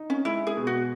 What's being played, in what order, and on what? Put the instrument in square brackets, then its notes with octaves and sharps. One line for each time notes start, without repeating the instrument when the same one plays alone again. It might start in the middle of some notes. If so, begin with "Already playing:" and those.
Already playing: [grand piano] D#4
[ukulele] C#4
[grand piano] G#3 [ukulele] E4
[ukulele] G#4
[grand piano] B2
[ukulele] F#4